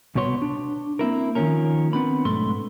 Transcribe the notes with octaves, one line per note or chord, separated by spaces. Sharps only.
C2 B2 B3 C#5 C6
D4
A#3 C4 E4 A#4
D#3 F3 G3 A#3 C#4 A#4
B3 C4 D4 B5
B1 G#2 A3 C6